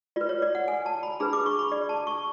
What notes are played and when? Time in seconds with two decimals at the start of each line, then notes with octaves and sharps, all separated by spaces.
0.16 F4 B4 D5
0.29 C#5
0.42 D5
0.55 F#5
0.68 G#5
0.86 A5
1.03 B5
1.20 D4 G#4 B4 B5
1.33 D6
1.46 C#6
1.59 B5
1.72 D5
1.89 A5
2.07 C#6